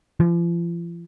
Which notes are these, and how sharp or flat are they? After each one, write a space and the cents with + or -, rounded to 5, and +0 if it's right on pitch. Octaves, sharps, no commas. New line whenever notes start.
F3 -40